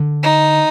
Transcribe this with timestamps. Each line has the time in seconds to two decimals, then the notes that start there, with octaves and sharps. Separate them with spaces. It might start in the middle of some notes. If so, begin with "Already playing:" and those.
Already playing: D3
0.23 D#4